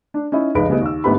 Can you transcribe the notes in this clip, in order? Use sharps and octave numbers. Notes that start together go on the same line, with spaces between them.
D4
C#4 D#4 E4
F1 C#2 D#4 B4 B5 D7
C#3 G3 A3 B3 C#4 D#4
D#2 E6
G1 G#2 A3 B3 G4 B5